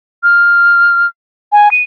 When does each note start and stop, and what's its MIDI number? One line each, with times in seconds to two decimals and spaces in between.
0.23 1.06 89
1.52 1.71 80
1.71 1.83 99